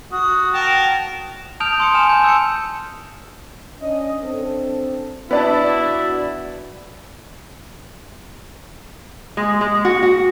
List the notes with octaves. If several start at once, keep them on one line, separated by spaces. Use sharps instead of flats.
F#4 D#6
A#4 G5 A5
A5 D#6 F6 G6 D7 F7
C6 D#6 C#7
G#5 D#6 F6 E7
A5 G6
E6 C#7
C#4 D4 D#5
C4 D4 A4
B3 D4 E4 F#4 D5 A5
G#3
G#3
F#4
F#4